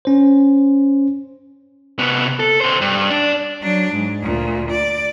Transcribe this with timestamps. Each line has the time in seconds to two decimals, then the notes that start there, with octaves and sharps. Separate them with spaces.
0.05 C#4 C5
1.98 C3 B3
2.40 A4
2.61 B2 C5
2.81 G2
3.10 D4
3.62 F#3 D4
3.93 G#2
4.23 D2 A#2
4.71 D5